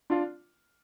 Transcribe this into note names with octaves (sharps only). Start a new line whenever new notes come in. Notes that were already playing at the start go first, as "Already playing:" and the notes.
D4 F4